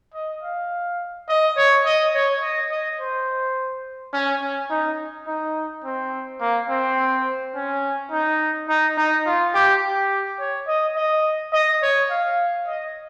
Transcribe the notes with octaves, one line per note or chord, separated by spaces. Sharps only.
D#5
F5
D#5
C#5
D#5
C#5
D#5
D#5
C5
C#4
C#4
D#4
D#4
C4
A#3
C4
C#4
D#4
D#4
D#4
F4
G4
G4
C#5
D#5
D#5
D#5
C#5
F5
D#5